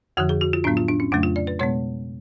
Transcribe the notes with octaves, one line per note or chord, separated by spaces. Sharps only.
F2 D3 F3 F#4
G#4
F#4
F4
A2 F#3 B3 D4
F4
D4
C#4
F2 C#3 F#3 A3 D4
F4
D5
B4
B2 G#3 B3 C#5